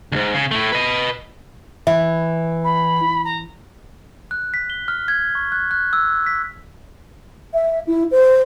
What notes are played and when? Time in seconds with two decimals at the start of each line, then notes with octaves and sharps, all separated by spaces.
0.12 D2 G#2
0.34 C#3
0.51 A2 A3
0.72 B4 D#5
1.87 E3 E5
2.64 B5
3.25 A#5
4.31 F#6
4.54 B6
4.70 G7
4.88 F6
5.08 G#6
5.35 C#6
5.52 F#6
5.71 F#6
5.93 E6
6.26 B6
7.54 E5
7.87 E4
8.11 C5